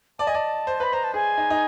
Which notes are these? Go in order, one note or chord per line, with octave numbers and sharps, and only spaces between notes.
D5 A5
D#5 G#5
D5 A5
C5
B4 B5
C5 A#5
A5
G#4 G#5
D#4
D#4